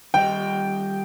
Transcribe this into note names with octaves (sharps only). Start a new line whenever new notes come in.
D#3 G3 D#5 G5